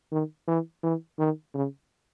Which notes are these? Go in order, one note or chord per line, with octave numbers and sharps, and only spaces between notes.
D#3
E3
E3
D#3
C#3